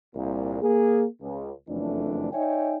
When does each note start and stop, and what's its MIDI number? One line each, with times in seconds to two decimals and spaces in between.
0.15 0.58 36
0.15 0.58 46
0.62 1.05 58
0.62 1.05 68
1.21 1.51 37
1.68 2.30 30
1.68 2.30 41
1.68 2.30 52
1.68 2.30 57
1.68 2.30 62
2.33 2.78 63
2.33 2.78 73
2.33 2.78 74
2.33 2.78 76
2.33 2.78 79
2.33 2.78 80